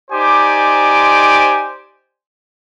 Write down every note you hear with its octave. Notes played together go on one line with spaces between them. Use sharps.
D#4 G4 C5 D5 G#5 D6